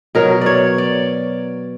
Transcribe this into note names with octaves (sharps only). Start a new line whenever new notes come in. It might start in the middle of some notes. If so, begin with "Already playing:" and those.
B2 F#3 A#4
C#5 D5
D5